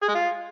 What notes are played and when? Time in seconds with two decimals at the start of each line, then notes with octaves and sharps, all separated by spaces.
0.02 G#4
0.08 G#3
0.15 F4